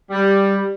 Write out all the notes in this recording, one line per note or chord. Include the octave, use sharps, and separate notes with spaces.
G3